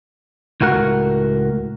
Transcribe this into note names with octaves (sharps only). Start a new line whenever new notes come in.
C#2 A2 F#4 A#4 F#5